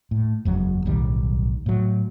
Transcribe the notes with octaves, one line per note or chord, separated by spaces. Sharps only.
A2
F#1 E2 F#3 G#3
D1 B1 D#3 G3
A2 F#3